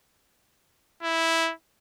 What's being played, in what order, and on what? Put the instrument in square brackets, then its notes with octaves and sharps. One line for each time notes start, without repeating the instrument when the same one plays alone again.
[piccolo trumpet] E4